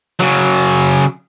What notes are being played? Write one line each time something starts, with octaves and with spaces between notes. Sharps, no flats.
C#3 F#3